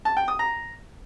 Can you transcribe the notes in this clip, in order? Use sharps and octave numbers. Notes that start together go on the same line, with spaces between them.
A5
G5
D#6
A#5